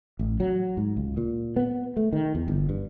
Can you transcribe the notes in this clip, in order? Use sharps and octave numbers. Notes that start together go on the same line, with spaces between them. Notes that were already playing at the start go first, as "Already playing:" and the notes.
A1
F#3
G#2
C#2
A#2
B3
A3
D#3
E2
G1
G2